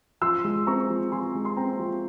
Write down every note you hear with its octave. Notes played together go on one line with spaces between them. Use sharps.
F3 C6 E6
G#3
C4 A#5 C#6
F3
F3 G#5 C6
G#3
C6
C4 G5 A#5
F3